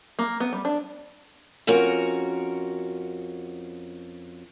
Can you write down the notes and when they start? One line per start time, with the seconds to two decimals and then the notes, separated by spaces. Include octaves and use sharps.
0.19 A#3
0.40 B3
0.53 G3
0.65 D4
1.67 F2 C#4 F#4 A#4